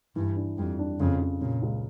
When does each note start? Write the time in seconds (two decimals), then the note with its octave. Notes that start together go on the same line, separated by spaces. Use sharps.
0.16 G2 E3
0.36 D4
0.58 F2 G3
0.79 D4
1.00 F2 C#3
1.21 C#3
1.41 A#2 C#3
1.62 C#2